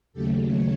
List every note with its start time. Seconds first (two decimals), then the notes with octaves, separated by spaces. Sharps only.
0.13 D#2 C#3 F#3 A3 G4 A4
0.46 C#5